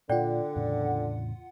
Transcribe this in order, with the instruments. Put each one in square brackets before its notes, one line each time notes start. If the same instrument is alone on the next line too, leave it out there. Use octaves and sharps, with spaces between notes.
[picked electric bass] A#2 [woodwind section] D3 [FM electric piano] F4 F#5 [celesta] D5 G5
[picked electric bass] E2 A2 C#3